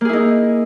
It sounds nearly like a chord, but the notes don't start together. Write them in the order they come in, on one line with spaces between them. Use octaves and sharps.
A#3 G#4 E4 D#4